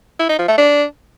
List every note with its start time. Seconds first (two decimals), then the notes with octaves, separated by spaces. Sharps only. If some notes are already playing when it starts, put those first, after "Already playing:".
0.19 E4
0.29 D#4
0.39 F3
0.48 A3
0.58 D4